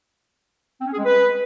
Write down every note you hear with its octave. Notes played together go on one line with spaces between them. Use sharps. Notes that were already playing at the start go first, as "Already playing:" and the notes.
C4
C#4
G#4
G#3
B4